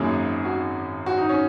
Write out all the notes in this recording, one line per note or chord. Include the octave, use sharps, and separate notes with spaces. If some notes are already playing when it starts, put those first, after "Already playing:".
Already playing: G#1 F#2 F#3 A#3 G#4
F#4
F#4
D#4
C#4